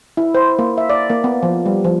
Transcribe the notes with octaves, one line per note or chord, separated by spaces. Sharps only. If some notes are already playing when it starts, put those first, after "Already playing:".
E4
C5
A#3
E5
D5
A#3
B3
F3
G3
F3